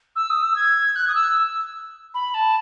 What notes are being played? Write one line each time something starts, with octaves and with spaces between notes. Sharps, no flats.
E6
D#6
E6
G#6
F#6
D#6
E6
B5
A5